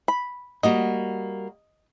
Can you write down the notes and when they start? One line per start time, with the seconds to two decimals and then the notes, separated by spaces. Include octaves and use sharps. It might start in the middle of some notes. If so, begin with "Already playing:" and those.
0.08 B5
0.63 G3 A#3 F#4 D#5